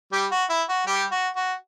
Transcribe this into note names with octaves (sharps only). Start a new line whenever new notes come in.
G3 G4
F#4
E4
F#4
G3 G4
F#4
F#4